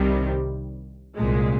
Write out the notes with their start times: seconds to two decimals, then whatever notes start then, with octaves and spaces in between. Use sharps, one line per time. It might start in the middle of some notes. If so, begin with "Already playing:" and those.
Already playing: C2 C3 D#3 G3
1.16 C2 A#2 G#3